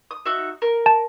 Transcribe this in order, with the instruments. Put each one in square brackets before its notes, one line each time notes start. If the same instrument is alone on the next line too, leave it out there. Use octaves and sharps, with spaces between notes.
[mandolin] D#6
D#4 F#4 E5
A#4
[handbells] A5